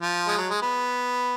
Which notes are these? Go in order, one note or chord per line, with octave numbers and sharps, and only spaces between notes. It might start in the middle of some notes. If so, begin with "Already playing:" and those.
F3
G#3
F#3
G#3
B3